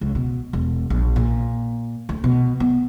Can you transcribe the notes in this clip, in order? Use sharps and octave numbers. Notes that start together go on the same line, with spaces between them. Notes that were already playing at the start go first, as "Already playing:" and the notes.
C#2
B2
E1
A#1
A#2
D2
B2
B3